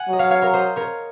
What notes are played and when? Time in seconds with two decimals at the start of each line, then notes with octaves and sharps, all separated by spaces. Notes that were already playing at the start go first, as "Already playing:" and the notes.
Already playing: F#5 G#5
0.09 F#3 D#5
0.19 C#5 F5
0.31 C#5 F5
0.42 A#4 C#5
0.54 C5 D#5
0.76 A#4 C#5